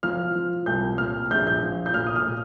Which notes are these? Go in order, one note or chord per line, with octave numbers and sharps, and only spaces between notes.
F3 F6
F3
C2 G6
A#2 F6
A#1 G6
G6
F3
G6
A#2 F6
D#6
F6
A#2